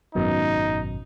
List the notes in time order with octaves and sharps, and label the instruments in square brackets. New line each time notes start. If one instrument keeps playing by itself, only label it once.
[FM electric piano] G#1 F#2 B2 [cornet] D#4